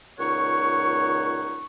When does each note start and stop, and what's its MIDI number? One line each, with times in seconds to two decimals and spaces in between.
0.19 1.65 37
0.19 1.65 46
0.19 1.65 63
0.19 1.65 73
0.19 1.65 78
0.19 1.65 85